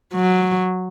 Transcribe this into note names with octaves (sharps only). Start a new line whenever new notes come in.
F#3